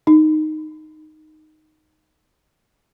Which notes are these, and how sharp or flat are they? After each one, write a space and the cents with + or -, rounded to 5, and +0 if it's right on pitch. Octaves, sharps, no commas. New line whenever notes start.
D#4 -5